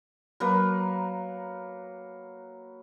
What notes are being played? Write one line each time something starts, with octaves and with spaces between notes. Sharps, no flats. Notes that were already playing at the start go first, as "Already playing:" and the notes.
F#3 A#3 B4